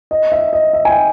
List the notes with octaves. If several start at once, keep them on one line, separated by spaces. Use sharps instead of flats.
D#5
E5
D#5
E5
G#5
G5